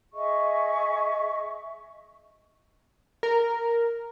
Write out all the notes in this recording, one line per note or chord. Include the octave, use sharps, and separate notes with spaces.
G#4 D#5 E5 C#6
A#4